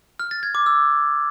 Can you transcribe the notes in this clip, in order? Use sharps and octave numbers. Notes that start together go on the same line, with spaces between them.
F6
A6
G#6
D6
E6